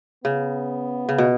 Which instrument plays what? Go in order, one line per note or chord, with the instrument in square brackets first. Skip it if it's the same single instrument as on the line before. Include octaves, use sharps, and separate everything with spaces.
[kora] C#3 [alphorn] B3
[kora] C#3
B2